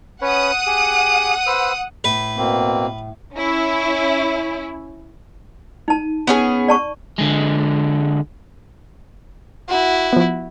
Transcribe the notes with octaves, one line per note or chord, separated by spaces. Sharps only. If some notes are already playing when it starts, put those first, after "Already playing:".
C#4 B4 C#5 F#5 D#6
G4 G#4
B4 C5 E6
A2 B4
B2 A#3 C4
C#4 E4
D#4 A5
B3 C#4 G#4
D5 A5 C#6
D3 G#3
E4 F#4
F3 B3